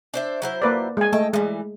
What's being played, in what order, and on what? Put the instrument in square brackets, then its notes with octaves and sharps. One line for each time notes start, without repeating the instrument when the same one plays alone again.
[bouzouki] D4 C5 E5
F#3 E4 C5
[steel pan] A#3 B4 D5
G#3 G#5
[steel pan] A3 [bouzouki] D#5 G5 A5
[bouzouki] E3 G3 [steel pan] G#3